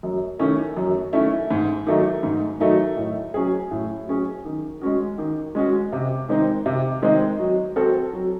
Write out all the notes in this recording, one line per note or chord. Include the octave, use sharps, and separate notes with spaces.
F#2
D#3 A3 C#4 E4
F#2
D#3 A3 C#4 E4
G#2
D#3 F#3 A3 D#4
G#2
D#3 F#3 A3 D#4
A2
F#3 C#4 G#4
A2
F#3 C#4 G#4
D#3
G#3 C#4 F#4
D#3
G#3 C#4 F#4
C3
D#3 G#3 C4 D#4
C3
D#3 G#3 C4 D#4
F#3
C4 F#4 A4
F#3